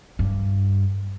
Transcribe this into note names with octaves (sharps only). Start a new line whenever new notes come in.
G2